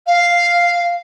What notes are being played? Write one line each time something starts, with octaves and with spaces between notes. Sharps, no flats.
F5